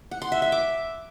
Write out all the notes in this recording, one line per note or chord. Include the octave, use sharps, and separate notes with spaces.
F#5
C6
E5
E5
D6